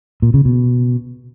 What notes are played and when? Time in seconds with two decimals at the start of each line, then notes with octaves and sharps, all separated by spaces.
0.22 A#2
0.34 C#3
0.45 B2